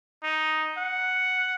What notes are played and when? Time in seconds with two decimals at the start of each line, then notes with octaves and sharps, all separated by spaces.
0.23 D#4
0.78 F#5